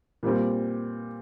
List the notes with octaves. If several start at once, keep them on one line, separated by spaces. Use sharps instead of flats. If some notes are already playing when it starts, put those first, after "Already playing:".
A#2 G3 C4